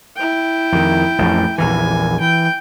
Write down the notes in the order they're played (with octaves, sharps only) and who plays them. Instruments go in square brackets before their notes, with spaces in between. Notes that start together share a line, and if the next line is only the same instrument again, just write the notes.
[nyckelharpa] E4 G5
[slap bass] F2 D#3
A1 F2 A3
[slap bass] A#1 E2 E3 [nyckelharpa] G#5
[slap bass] E3 [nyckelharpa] G5